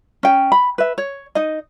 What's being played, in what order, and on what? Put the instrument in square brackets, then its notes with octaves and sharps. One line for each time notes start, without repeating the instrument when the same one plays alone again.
[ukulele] C#4 G5
B5
B4 E5
C#5
D#4 D#5